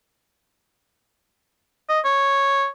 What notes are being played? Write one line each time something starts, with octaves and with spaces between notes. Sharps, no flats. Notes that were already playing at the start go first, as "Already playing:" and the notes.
D#5
C#5